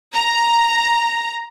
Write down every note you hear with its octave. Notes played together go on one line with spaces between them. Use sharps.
A#5